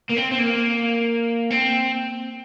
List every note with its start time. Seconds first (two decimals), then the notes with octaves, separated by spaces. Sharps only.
0.09 A#3
0.16 C4
0.31 C4
0.39 A#3
1.51 C4